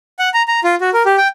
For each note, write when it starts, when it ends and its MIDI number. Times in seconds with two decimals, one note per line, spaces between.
0.19 0.29 78
0.34 0.42 82
0.48 0.60 82
0.64 0.75 65
0.81 0.90 66
0.93 1.03 70
1.06 1.16 67
1.18 1.28 79